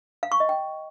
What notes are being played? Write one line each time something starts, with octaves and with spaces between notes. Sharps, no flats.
F5
C#6
D#5
G5